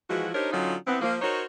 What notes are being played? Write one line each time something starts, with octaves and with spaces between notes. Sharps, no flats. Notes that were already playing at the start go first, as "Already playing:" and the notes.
E3 F3 G#3 E4 F#4
D4 D#4 G4 A#4 C5 C#5
D3 F#3 C#4 D#4 F4
E3 B3 C4
F3 A#3
D#4 F#4 A#4 C5 C#5